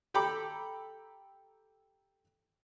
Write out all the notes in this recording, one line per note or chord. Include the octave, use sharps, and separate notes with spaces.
G4 A4 G5 A#5 B5 D6